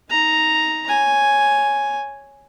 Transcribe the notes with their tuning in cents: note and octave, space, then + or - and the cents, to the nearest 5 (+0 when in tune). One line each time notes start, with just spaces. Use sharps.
D#4 +20 A#5 +0
C#5 +0 G#5 +0